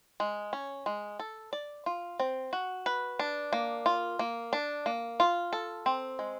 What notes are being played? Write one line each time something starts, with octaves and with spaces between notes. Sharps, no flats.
G#3
C#4
G#3
A4
D5
F4
C4
F#4
B4
D4
A#3
F4
A#3
D4
A#3
F4
A4
C4
G#3